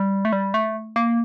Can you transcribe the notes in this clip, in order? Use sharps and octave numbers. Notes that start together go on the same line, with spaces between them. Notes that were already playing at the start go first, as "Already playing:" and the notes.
Already playing: G3
A3
G3
A3
A#3